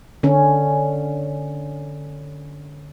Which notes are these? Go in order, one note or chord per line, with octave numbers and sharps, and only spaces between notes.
D3 C#4